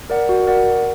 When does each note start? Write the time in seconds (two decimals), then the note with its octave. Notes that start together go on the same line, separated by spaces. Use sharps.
0.10 A#4 D5 F#5
0.29 F#4
0.47 A#4 D5 F#5